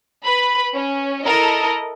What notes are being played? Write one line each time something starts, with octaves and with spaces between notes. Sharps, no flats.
B4 B5
C#4
E4 A4 A#4 D#5